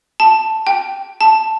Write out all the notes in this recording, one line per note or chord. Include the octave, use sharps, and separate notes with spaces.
A5
G5
A5